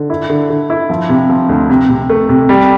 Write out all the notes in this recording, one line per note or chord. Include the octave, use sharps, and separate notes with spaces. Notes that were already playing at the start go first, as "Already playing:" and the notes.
Already playing: D3
E4
D3
D3
E4
F3
C3
F3
D2
C3
C3
A3
C3
G3